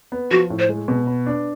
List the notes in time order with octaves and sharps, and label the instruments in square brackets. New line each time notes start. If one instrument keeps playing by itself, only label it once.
[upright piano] B3
[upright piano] F3 [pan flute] F#4
[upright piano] A2
[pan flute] C5
[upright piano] G#3
B2
B3
D4